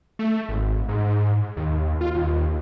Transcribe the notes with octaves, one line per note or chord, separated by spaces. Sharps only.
A3
G#1
G#2
D#2
F4
D#2